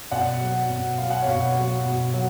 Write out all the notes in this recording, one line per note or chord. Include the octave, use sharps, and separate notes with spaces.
B2 D5 F#5
F#3
B2
F#3 F5
F#5
B2 C#5 F5
F#3
B2
F#3